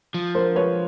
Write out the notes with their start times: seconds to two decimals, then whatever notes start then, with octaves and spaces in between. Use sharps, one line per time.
0.14 F3
0.35 A#4 C5
0.56 B4 C#5